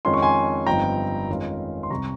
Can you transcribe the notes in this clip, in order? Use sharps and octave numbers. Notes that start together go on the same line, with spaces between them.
F2 D#3 G#3 C#4 F4 C6
C#6
G#5 C6
G1 G2 F3 C4 D#4 G5 A#5
F2 D#3 G#3 C#4 F4
C6
C2 C3 G3 A#5 C#6